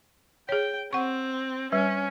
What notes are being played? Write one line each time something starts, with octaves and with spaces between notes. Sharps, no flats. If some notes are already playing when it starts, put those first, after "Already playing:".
G#4 C#5 G5
C4 F#5 C#6
G3 C#4 B4